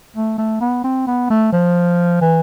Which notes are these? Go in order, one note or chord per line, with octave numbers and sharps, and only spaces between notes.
A3
A3
B3
C4
B3
A3
F3
E3